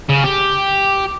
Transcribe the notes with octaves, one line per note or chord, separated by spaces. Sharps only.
C#3
G4